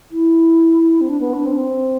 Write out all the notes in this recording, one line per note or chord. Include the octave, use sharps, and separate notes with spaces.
E4
C4
D4
B3
D4
C4
D4
C4